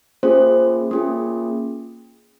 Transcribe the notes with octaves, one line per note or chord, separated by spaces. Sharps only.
A#3 C#4 F4 G#4 C5
A#3 C#4 F4 G#4